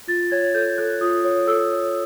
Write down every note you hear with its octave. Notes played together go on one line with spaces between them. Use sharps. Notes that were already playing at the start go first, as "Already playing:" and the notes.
F4 A6
C#5 G#6
A4 G6
A4 F#6
F4 D#6
C#5
A4 E6
C#5